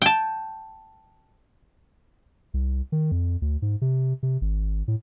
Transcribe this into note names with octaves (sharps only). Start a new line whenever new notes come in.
G5 A5
C2
D#3
F2
D2
G#2
C3
C3
G#1
A2